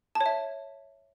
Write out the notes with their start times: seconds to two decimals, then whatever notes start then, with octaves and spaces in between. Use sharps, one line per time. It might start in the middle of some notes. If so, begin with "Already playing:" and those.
0.15 A5
0.21 C#5
0.26 E5